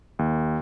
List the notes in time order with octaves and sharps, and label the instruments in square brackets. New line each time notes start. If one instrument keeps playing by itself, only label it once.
[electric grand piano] D#2